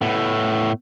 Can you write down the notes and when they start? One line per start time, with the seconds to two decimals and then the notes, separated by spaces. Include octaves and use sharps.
0.01 A2 B3